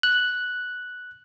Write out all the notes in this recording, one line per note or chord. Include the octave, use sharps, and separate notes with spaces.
F#6